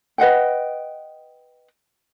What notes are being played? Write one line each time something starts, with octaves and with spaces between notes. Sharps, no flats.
B4 D#5 F#5 G5